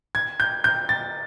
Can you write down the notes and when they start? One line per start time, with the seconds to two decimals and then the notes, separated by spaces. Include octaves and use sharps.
0.15 G#6
0.40 G6
0.64 G6
0.89 A6